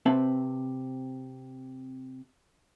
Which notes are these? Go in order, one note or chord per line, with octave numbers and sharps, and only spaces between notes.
C3 C4 B4 E5 A5